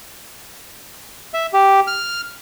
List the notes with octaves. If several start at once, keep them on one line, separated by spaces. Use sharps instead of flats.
E5
G4
F6